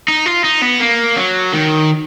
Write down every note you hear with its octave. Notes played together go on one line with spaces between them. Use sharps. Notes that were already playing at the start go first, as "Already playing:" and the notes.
D#4
F4
D#4
B3
A#3
F#3
D#3